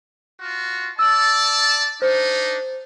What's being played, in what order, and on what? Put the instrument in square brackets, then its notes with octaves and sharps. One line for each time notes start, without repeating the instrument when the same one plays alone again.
[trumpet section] F4 F#4
[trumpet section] D5 A5 [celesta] E6 F#7
[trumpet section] D4 D#4 [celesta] C5